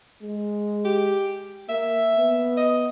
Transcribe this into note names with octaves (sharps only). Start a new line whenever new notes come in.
G#3
G4
A#3 E5
B3
D#5